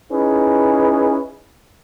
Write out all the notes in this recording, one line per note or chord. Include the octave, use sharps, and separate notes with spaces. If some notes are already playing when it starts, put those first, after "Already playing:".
C#4 D#4 E4 G#4 B4